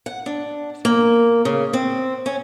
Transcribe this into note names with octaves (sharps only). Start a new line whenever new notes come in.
F#5
D4
A#3
C#3
C4
C#4